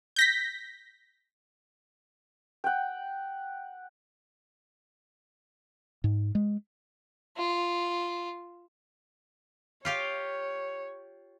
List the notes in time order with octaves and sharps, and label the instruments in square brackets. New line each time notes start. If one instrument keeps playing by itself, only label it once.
[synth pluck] G6 A#6 B6
[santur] F#5 G5
[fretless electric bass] G#2
G#3
[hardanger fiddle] F4
[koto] F4 G4 F5 [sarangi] C#5